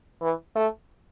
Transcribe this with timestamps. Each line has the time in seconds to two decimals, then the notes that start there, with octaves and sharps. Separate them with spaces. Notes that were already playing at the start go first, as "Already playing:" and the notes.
0.21 E3
0.55 A3